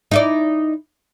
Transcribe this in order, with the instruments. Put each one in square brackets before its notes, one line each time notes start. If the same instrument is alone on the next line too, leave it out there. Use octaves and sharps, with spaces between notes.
[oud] D#4 E4 D5